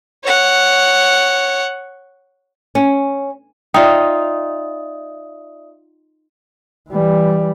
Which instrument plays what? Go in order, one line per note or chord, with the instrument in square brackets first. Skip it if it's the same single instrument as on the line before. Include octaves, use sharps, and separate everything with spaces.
[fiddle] C#5 F#5
[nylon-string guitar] C#4
[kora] D#4 F4 [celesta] D5 E5 D#6 [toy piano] G5
[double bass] E3 G3